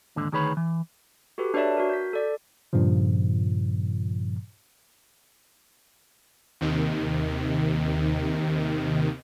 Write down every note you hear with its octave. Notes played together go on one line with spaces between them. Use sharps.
D#2 G#2 D3
D2 D#3 G#4 B4 C#5 B5
E3
F#4 G4 A4 B4
D4 B4 C#5 D5 E5 A5
F#4 A#4
G6 B6
A4 D5
G2 A#2 C#3 F3
D#2 C3 D#3